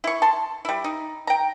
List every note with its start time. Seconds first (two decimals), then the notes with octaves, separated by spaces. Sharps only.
0.04 E4 C#6
0.22 A5 C6
0.65 G3 E4
0.84 D#4
1.27 G5 A#5